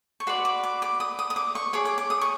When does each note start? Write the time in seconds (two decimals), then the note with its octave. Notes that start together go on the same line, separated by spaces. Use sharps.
0.20 C#6
0.27 F#4 B4 D5 C6
0.45 D6
0.63 D6
0.82 D6
1.00 D#6
1.19 D#6
1.30 D#6
1.36 D6
1.55 C#6
1.73 G#4 C#5 D6
1.85 D6
1.98 D6
2.10 D#6
2.21 C#6